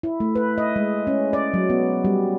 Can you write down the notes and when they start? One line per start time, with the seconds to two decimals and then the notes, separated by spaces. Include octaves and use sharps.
0.03 E4
0.20 A3
0.35 B4
0.58 D#5
0.76 G#3
1.07 C#4
1.33 D5
1.54 F#3
1.70 B3
2.05 G3